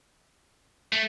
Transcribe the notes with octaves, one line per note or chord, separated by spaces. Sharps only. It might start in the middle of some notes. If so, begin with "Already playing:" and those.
A3